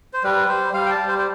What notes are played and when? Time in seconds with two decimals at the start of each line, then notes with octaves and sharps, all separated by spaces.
0.13 C5
0.24 G3 B4
0.48 G3 C5
0.74 G3 F5
0.86 G5
0.90 A5
0.98 G3
1.08 C5
1.18 C5